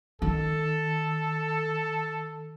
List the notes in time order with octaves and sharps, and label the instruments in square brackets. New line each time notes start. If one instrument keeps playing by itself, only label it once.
[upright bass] D#3 [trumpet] A4